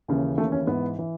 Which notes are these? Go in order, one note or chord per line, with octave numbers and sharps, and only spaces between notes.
D#2 C#3 E3
D#2 C#3 E3 A3
C#4
G#2 E3 B3
E3